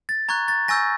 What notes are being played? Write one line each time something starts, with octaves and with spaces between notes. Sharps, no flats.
A6
A#5 C#6 F#6 G#6
A6
G#5 C#6 E6 G6 A#6